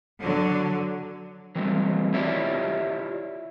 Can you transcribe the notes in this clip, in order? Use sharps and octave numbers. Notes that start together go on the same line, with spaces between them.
D3 F#3
E3 F#3 G3 A3 C4
E4 F4 G4 C#5 D5 E5